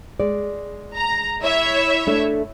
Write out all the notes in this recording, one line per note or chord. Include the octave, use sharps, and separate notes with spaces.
G#3 D5
A#5
E4 C#5 E5
A3 D4